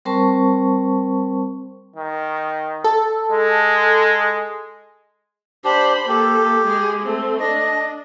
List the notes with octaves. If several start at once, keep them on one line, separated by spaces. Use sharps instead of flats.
G3 C4 A#4 C5 A5 C#6
D#3
A4
G#3
D4 G4 C5 B5
A#3 G4 A4
G#3 G#4
A3 C4
D4 D#5